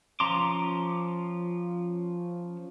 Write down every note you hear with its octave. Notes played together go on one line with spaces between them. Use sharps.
F3 C#4 A#5 C6 D6